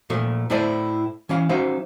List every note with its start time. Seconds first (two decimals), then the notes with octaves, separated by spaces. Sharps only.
0.10 A#2 F3 A3
0.50 A2 A3 E4 C5 D5 D#5
1.29 E3 C#4 F5
1.49 F#3 C#4 D#4 C5 E5 F5